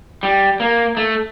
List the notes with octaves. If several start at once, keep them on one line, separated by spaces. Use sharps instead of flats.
G3
A#3
A3